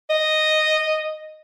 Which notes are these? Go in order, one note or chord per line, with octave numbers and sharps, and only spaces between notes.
D#5